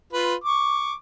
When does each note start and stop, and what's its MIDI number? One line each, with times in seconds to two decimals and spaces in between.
0.13 0.35 65
0.13 0.35 71
0.44 0.94 85
0.44 0.94 86